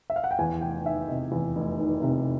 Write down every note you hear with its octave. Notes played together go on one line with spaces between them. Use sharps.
E5
F5
F#5
G5
E2 G#5
F1 G5
D#3 E5
C3 D#5
E2
F1
D#3
C3